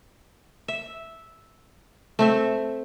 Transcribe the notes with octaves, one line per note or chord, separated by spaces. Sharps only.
E5
A3 C4 E5